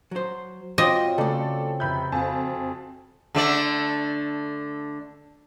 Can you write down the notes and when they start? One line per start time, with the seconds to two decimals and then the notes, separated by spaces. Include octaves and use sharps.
0.11 F#3 C5
0.78 F#3 C4 F4 C5 D5 D#5
1.18 C#3 A3 A4 D5
1.80 F1 E5 B5 G6
2.12 F2 F#4 F5 G#5 A5
3.35 D3 A3 D5